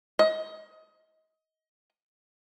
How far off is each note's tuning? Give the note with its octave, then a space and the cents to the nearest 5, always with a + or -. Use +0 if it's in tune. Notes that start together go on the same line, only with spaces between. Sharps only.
D#5 +25